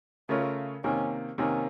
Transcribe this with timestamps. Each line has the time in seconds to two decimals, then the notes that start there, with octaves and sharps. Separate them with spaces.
0.29 C#3 A3 C#4 F4 A#4
0.84 C3 D#3 A#3 C#4
1.38 C3 D#3 A#3 C#4